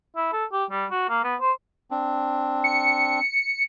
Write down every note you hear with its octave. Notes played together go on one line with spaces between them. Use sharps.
E4
A4
G4
G3
F#4
A#3
B3
C5
C4 D4
C#7